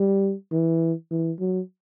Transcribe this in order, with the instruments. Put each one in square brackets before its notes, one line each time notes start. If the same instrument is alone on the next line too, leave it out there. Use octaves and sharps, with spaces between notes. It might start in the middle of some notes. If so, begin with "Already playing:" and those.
Already playing: [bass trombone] G3
E3
E3
F#3